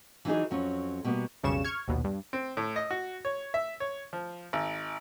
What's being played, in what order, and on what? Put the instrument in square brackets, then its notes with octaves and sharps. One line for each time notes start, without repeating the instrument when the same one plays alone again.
[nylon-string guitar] E3 F#3 D4 D#4 G#4
F2 F#3 C#4
B2 G3 A#3 B3
[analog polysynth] B1 F2 C#3 G3 C#6 E7
C#6 F6 G#6
A#1 D#2 B2
G2
[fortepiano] C4
A2
D#5
F#4
C#5
E5
C#5
F3
G#1